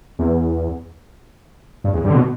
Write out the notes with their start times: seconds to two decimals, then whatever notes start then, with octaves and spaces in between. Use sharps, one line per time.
0.19 E2
1.84 G2
1.94 E2
2.04 G2
2.10 D3
2.14 B2